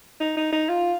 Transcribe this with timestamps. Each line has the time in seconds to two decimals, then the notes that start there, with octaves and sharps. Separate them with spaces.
0.20 D#4
0.37 D#4
0.52 D#4
0.69 F4